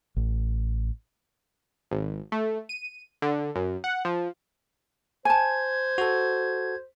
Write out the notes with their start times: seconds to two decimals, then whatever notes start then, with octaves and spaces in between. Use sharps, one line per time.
0.16 A1
1.91 G#1
2.32 A3
2.69 D#7
3.22 D3
3.56 F#2
3.84 F#5
4.05 F3
5.25 C5 G#5 A5 G#6
5.98 F#4 A4